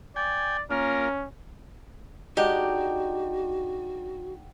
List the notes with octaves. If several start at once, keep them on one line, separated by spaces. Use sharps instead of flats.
D5 G5 G#5
A#3 C#4 F4 A#4
G#3 D4 D#4 F#4 G4 F#5 G5